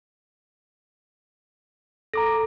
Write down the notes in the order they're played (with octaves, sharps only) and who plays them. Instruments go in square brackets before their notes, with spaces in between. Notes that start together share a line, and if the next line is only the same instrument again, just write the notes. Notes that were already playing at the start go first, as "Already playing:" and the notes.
[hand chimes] A4 [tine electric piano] A#5 D6 A#6